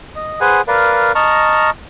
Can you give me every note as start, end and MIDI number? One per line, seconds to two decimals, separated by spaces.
0.16 0.40 75
0.41 0.61 68
0.41 0.61 71
0.41 0.61 72
0.41 0.61 78
0.41 0.61 80
0.68 1.12 70
0.68 1.12 71
0.68 1.12 74
0.68 1.12 77
1.15 1.70 75
1.15 1.70 81
1.15 1.70 82
1.15 1.70 85
1.15 1.70 89